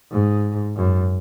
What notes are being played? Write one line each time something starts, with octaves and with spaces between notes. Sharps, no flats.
G#2
F#2